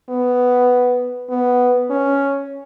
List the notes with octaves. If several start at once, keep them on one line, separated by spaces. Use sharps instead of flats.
B3
B3
C#4